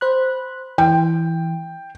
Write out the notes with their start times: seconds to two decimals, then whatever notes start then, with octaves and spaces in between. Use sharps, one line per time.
0.01 C5 B5 F#6
0.78 E3 G5